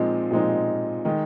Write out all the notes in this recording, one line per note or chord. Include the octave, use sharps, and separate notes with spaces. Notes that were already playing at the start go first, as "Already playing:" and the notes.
Already playing: A#2 F3 G#3 C4 D#4
A#2 F3 G#3 C4 D#4
D#3 G#3 D#4